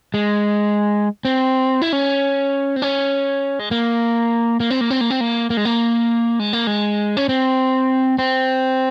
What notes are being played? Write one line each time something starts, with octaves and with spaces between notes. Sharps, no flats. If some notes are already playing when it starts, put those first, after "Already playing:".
G#3
C4
E4
C#4
C4
C#4
G#3
A#3
A#3
C4
A#3
C4
A#3
C4
A#3
A#3
G#3
A#3
G#3
A#3
G#3
C#4
C4
C4